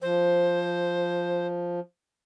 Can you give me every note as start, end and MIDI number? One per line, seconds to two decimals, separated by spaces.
0.02 1.80 53
0.02 1.47 72